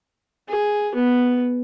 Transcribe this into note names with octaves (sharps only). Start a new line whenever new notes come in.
G#4
B3